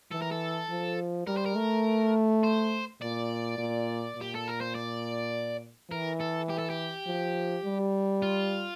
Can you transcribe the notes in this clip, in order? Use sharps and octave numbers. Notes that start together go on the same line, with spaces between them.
E3 A4
A#4
A4
F3
G3 A#4
C5
A#4
A3
C5
A#2 D5
A#2
A#2 G4
A4
A#4
C5
D5
E3 A#4
A4
G4
A4
G4
F3
G3
F4